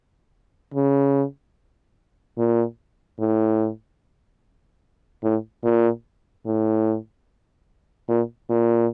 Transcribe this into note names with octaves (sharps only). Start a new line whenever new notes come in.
C#3
A#2
A2
A2
A#2
A2
A#2
A#2